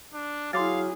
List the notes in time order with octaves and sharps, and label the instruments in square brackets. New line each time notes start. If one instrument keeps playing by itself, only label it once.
[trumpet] D4
[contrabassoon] F#3 [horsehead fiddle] E4 G#4 [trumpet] F5 [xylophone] C6 D6 A6